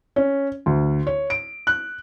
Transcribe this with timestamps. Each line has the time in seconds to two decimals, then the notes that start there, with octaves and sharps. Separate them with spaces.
0.16 C#4
0.66 D2
1.07 C#5
1.30 D7
1.67 F#6